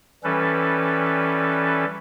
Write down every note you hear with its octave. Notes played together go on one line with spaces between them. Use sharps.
E3 G3 C#4 A4 B4